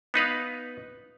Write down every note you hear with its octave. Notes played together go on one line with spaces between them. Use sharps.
B3 D#4 B4 F5